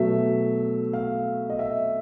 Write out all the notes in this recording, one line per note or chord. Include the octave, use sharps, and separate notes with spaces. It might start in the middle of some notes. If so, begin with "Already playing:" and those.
Already playing: B2 F#3 A3 E5
F5
D#5
E5